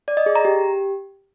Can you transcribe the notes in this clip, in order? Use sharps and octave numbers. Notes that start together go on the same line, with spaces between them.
D5
D#5
G#4
A#5
G4